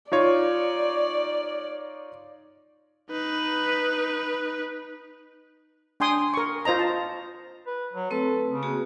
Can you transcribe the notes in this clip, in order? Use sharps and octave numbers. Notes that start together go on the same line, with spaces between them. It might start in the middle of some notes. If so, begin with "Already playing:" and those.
D#4 F4 C#5 D5
D#4 B4
D4 G5 G#5 C6 D#6
A#4 C#6
F4 C5 D#5 A#5
A5
B4
F#3
A3 C4 A4 B4
C#3
A#3 F#4 G#4